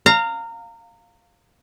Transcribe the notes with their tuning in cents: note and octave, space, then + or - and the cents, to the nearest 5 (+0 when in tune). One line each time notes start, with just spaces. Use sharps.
F5 +0 A#5 -25